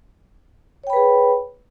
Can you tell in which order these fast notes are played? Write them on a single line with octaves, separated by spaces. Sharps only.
C#5 G5 B5 B4 G#4